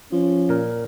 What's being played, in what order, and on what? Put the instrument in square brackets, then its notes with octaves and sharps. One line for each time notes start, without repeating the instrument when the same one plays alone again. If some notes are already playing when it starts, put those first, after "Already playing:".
[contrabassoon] F3 [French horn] C#4
[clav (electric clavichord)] A#2 A#4